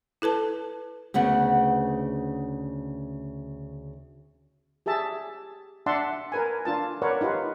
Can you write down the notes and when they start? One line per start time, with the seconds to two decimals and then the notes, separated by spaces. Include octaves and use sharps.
0.22 E4 A4 B4 A5
1.14 D2 C#3 B3 F#5
4.86 G4 G#4 E5 A5
5.86 D4 D5 E5 F#5 A5 C6
6.32 A#4 B4 G#5
6.65 D4 F4 A5
7.02 A#4 B4 C#5 D5 F#5
7.21 D#4 F4 G4 B4